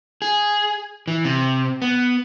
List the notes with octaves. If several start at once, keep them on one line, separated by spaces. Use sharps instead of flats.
G#4
E3
C3
B3